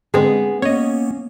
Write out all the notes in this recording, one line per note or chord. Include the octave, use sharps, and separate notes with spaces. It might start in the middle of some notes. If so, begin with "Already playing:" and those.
D3 G#3 B3 C4 G#4
A#3 B3 C#4 C#5 D#5